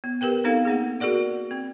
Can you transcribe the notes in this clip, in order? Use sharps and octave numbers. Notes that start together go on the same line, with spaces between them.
B3
G4 A#4 B4 G5
B3 C4 D#4 A4 F5
A#3 D#4 G#4
F#4 G#4 A#4 D5 F#5
C4